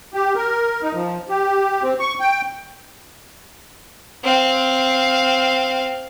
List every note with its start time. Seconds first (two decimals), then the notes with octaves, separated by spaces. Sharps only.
0.14 G4
0.36 A#4
0.82 D#4
0.93 F3
1.29 G4
1.83 C4
2.00 C#6
2.20 G5
4.23 C4 F5